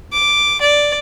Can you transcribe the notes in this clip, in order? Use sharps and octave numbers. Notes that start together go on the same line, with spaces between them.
D6
D5